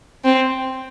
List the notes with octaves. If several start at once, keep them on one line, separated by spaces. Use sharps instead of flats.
C4